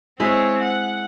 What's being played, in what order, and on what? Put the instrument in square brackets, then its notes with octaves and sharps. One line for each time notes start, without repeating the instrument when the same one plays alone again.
[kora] G#3 E4 [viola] C4 C#5
[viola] F#5